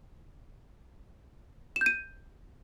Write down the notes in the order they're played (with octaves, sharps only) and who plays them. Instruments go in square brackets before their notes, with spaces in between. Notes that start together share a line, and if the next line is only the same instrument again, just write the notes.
[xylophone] E7
G6
D#7